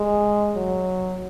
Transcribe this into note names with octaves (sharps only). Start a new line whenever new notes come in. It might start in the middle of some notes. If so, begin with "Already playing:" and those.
Already playing: G#3
F#3